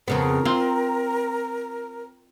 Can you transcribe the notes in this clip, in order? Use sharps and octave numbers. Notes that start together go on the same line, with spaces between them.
F2 C#3 B3 A#4
C4 F4